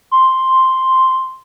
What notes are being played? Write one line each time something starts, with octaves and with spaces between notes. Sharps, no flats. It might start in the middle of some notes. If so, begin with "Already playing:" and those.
C6